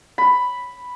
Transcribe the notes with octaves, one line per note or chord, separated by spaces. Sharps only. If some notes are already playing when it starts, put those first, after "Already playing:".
B5